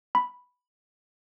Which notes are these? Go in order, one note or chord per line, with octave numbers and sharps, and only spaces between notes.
B5